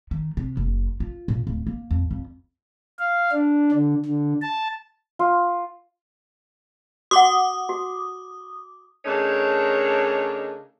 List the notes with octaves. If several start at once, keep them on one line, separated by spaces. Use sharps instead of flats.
D#3
C3
F#1
F4
A#2
D1
A#3
F2
F2
F5
D4
D3
D3
A5
F4
F#4 F#5 D6 D#6
F#4
C#3 A3 D4 D#4 A#4 C#5